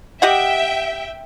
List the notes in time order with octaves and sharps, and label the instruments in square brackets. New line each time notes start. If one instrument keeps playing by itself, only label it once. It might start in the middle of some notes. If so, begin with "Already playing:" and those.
[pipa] G4 D#5 F#5 [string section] E5 G5